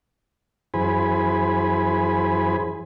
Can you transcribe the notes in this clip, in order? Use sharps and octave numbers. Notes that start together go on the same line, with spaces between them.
F#2 E3 G#4 C5 G#5 B5